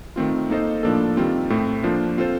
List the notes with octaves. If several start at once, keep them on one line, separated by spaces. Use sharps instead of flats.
D#3 A3 C4 F4
A#3 D#4 A4 C5 D#5
A2 F3 A#3 D4 A4
D#3 G3 C4 F4
A2 A3 C4
F3 A#3 D4 F4 C5
C4 F4 A4 C5